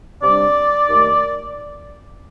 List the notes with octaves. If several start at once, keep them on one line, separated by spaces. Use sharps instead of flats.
C3 G3 D4 D5
D#2 D#3 A3 D#4